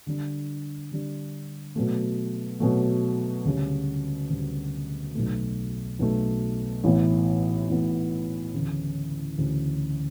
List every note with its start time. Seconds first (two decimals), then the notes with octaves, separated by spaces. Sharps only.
0.07 D3 G3 D4
0.91 D3 G3 D4
1.76 B2 F#3 A3
2.60 B2 F#3 A3
3.45 D2 C#3 G3
4.30 D2 C#3 G3
5.14 B1 B2 A3
5.99 B1 B2 A3
6.84 A1 A2 E3 B3
7.69 A1 A2 E3 B3
8.54 D2 C#3 E3
9.38 D2 C#3 E3